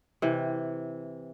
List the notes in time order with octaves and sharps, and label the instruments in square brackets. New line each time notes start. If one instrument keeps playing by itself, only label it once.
[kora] C3 E3